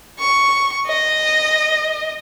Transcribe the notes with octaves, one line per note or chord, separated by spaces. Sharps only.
C#6
D#5